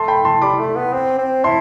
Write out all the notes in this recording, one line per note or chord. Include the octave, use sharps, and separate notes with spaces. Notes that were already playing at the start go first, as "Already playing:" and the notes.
Already playing: A3 A5 C6
G5 B5
A5 C6
G3 B5 D6
A3
B3
C4
C4
E4 A5 C6